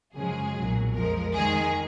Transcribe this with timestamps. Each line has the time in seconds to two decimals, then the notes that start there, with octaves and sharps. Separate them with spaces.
0.14 F#2 C#3 F3 G#3 G#4
0.54 B1 A#2 F#3
0.95 F2 F3 G#3 A#4
1.35 F2 D#3 G#3 G#4